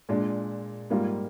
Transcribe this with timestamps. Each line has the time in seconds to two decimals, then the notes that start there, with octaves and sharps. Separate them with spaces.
0.09 A#2 G#3 D4
0.90 G#2 G3 A#3 F4